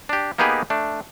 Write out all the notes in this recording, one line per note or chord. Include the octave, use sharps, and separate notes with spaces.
D4 G4
A#3 B3 D#4 G4 G#4 B4
A3 D4